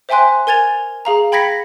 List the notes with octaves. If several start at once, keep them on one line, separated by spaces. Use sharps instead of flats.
C5 E5 G5 G#5 C6 F#6
A#4 G#5 G#6 A6 F7
G#4 F5 A#5
G5 B5 G#6 A#6 B6 C#7